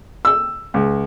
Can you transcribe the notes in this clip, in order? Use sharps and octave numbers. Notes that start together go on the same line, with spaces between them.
E6
C#2